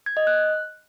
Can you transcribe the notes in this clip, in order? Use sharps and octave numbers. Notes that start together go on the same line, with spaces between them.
G#6
D#5
F#6